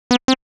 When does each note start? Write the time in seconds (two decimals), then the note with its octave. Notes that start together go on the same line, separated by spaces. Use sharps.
0.11 B3
0.28 C4